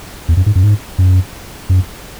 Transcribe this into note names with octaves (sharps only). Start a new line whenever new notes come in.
E2
F#2
G#2
F#2
G#2
F#2
F#2